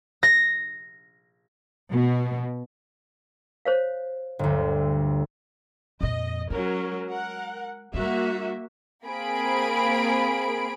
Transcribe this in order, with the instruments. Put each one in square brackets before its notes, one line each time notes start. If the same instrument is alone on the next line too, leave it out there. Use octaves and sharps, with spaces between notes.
[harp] A#6
[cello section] B2
[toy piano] C5 C#5 F5
[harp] G1 D2
[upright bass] F2 A#2 [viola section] D#5
[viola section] F#3 C#4 A#4 [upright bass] G#3
[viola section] A#4 F#5
[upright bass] G3 D4 [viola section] A#3 F#4 E5
[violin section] A#3 C4 G#4 B5 D7